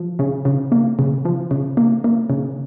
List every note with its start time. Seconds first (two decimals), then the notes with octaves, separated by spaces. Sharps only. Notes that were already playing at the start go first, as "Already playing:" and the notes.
Already playing: F3
0.19 C#3
0.45 C#3
0.72 A#3
0.99 C#3
1.25 F3
1.51 C#3
1.77 A#3
2.04 A#3
2.30 C#3